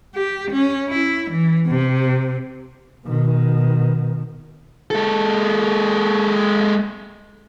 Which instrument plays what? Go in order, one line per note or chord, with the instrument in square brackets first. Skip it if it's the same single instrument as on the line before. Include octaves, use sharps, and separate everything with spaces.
[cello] G4
C#4
E4
E3
C3
[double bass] B2 D#3
[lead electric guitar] G#3 A4